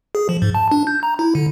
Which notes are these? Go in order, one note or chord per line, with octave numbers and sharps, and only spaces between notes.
G#4
F3
G#2
A5
D4
G6
A#5
E4
D3